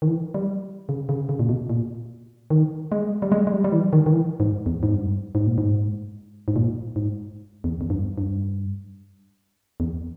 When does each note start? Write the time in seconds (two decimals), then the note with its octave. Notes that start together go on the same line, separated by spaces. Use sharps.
0.02 D#3
0.07 E3
0.34 G3
0.89 C#3
1.09 C#3
1.29 C#3
1.39 A#2
1.49 B2
1.70 A#2
2.50 D#3
2.92 G#3
3.22 G3
3.32 G#3
3.47 G#3
3.52 G3
3.64 G3
3.72 E3
3.93 D#3
4.06 D#3
4.12 E3
4.40 G#2
4.66 E2
4.83 G#2
4.94 G2
5.35 G#2
5.46 A#2
5.58 G#2
6.48 G#2
6.56 A#2
6.96 G#2
7.64 E2
7.81 E2
7.90 G2
8.18 G2
9.80 E2